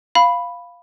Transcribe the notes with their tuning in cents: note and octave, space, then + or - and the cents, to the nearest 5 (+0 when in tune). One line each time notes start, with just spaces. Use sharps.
F5 +0 B5 +0